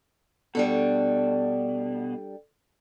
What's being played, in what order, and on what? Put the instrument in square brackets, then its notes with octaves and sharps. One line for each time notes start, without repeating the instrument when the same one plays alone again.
[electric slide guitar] B2 [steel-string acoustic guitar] G3 D4 A4